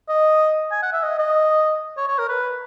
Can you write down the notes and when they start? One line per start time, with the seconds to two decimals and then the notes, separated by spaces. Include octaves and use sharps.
0.09 D#5
0.72 G#5
0.83 F#5
0.93 E5
1.03 D#5
1.19 D#5
1.97 C#5
2.08 C#5
2.18 A#4
2.28 B4